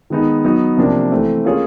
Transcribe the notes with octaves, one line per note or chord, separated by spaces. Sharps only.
D#3 G#3 B3 D#4
F#3 B3 D#4
C3 F3 A#3 D4
E3 A3 C4
A#3 C#4 F4 G#4 C#5